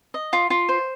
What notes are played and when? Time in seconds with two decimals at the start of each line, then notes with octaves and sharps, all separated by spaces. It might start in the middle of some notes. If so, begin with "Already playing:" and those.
0.14 D#5
0.33 F4
0.50 F4
0.69 C5